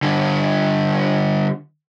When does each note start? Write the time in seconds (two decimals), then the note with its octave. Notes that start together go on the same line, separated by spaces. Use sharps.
0.03 D3 G3